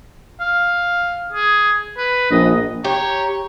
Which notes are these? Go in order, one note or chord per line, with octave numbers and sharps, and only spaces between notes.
F5
G#4
B4
A#1 D#5
G4 C#5 A#5